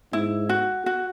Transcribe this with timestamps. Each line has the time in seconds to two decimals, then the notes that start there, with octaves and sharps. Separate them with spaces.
0.12 G#2 E4
0.49 F#4
0.86 F#4